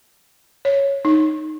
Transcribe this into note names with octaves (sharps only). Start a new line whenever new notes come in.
C#5
D#4